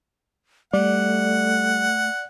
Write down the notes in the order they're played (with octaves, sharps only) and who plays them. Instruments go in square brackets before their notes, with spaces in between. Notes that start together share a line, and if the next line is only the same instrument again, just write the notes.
[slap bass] G3 [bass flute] A3 [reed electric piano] D5 [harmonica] F#5